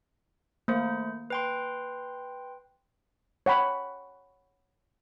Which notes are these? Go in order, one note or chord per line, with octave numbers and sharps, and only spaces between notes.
A3 A#3 C5
B4 G5 C6
C#5 F#5 G5 B5